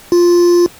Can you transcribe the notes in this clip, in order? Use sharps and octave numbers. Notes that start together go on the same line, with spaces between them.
F4